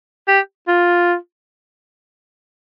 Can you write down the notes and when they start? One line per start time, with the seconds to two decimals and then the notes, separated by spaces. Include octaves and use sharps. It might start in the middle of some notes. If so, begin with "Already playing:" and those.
0.28 G4
0.68 F4